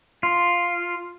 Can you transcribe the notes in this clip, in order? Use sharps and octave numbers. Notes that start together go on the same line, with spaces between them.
F4